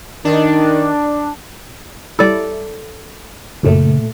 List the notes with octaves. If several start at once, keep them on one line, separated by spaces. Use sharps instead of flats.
D#3 D4
G3 E4 A4 D5
G#1 F#2 A#2 C#3 A3